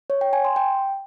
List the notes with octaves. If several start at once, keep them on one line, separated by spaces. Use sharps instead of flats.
C#5
G5
G#5
C6
G5